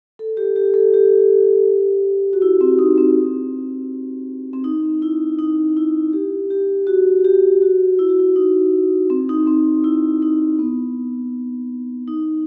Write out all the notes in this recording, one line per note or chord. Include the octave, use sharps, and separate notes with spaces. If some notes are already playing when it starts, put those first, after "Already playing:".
A4
G4
G4
A4
G4
F#4
E4
C4
D#4
C4
C4
D#4
E4
D#4
E4
G4
G4
F#4
G4
F#4
E4
F#4
E4
D#4
C4
D#4
C4
E4
D#4
B3
D#4